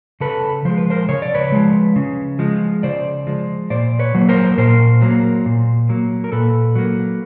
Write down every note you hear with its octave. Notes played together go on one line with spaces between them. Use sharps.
C#3 A4 B4
F3 G#3 C5
B4
A#4 C5
C#3 C#5
D5
B4 C#5
F3 G#3
C#3
F3 G#3
C#3 C5 D5
F3 G#3
A#2 C5 D5
B4 C#5
F#3 A#3
A#4 C5
A#2 A#4 C5
F#3 A#3
A#2
F#3 A#3
A#4
A#2 A4 B4
F#3 A#3